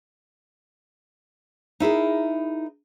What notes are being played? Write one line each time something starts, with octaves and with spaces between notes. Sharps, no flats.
D#4 E4 G#4 A#4